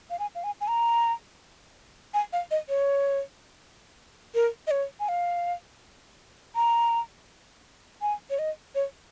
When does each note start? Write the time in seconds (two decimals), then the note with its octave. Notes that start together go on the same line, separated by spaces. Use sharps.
0.10 F5
0.19 G#5
0.35 F5
0.44 G#5
0.61 G#5
0.68 A#5
2.14 G#5
2.33 F5
2.51 D#5
2.69 C#5
4.34 A#4
4.67 D#5
4.71 C#5
5.00 G#5
5.08 F5
6.55 A#5
8.02 G#5
8.30 C#5
8.39 D#5
8.75 C#5